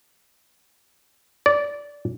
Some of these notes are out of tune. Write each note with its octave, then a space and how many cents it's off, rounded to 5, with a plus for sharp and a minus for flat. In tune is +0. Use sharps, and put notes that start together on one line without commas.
D5 -15